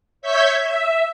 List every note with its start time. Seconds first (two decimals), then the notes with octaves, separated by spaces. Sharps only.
0.22 C#5 E5 C#6 G6 G#6 B6
0.60 E5